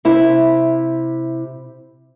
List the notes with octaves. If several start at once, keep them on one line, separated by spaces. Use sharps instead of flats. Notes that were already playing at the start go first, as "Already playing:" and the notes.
C3 E4